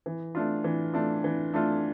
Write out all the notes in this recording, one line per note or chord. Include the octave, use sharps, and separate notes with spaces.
E3
A3 D4 F4
E3
A3 D4 F4
E3
A3 D4 F4